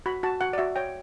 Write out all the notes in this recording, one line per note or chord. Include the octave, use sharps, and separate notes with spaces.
F#4 B5
F#4 A5
F#4 F#5
D5
F#4 E5
C#5 G5